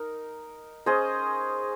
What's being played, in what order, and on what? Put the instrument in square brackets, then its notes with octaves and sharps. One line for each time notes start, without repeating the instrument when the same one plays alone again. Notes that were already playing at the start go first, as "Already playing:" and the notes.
Already playing: [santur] D#4 A#4
C#4 G#4 C5 D#5